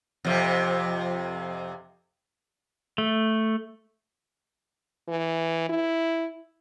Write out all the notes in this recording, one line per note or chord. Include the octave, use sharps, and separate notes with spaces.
F2 C3
A3
E3
E4